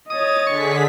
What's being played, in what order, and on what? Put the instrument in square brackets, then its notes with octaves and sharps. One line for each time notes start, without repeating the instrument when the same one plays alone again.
[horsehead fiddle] C#5 D#5 [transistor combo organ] D#6 [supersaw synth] A6
[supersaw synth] D3 G#4 B6 [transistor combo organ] C#6